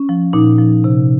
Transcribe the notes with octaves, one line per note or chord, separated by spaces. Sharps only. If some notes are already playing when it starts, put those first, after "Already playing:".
Already playing: C#4
F3
A#2 D#4
F3
C3